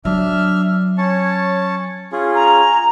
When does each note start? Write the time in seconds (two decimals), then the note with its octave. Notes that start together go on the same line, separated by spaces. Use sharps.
0.05 F#3 D4 E5 F6
0.98 C#4 C#5 A5
2.12 C#4 F4 G#4
2.35 A#5